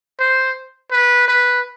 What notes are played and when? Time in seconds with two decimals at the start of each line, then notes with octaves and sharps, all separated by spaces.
0.19 C5
0.91 B4
1.28 B4